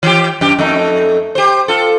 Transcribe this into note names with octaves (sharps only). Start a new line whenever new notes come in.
E3 G4
F#2 G4
F2 A3 D#4
G4 C5
F4 A4